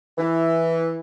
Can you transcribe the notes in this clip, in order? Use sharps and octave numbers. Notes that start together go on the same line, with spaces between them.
E3